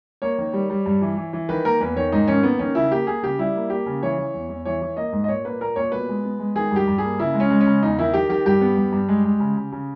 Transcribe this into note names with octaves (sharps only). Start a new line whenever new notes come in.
A#3 C#5
D#3
G3
G3
G2
E3
E3
E3
D#3 B4
A#3 A#4
E2 B4
D#3 C#5
G#2 D#4
D#3 C#4
A#3 B3
D#3 C#4
C#3 E4
A#3 G4
A#3 G#4
C#3 G4
G3 E4
A#3
A#3 G4
C#3
E3 C#5
E3
E2
E2
E3 C#5
E3
A#3 D#5
G#2
D#5
A#2 C#5
A#3 B4
A#2 A#4
A#2 C#5
B2 B4
G#3
B3
G#3
D#3 G#4
G2 G4
G2
A#3 G#4
C#3 E4
G#3
C#4
G#3
C#4
C#3
E2 D#4
D#3 E4
D#3 G4
D#3 G4
G2 G4
B3
G2
G2
G#3
G#3
C#3
C#3
C#3